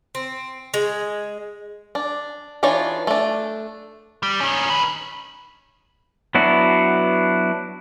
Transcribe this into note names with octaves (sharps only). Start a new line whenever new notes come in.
C4
G#3
D4
E3 D4 D#4 F4 C#5
A3 D4
G3
D#3 C#4
D#4 B4
F#3 B3 D4 E4 F#4